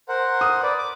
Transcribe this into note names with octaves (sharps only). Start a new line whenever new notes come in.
A#4 C5 F#5
D#6
B4 D5
D6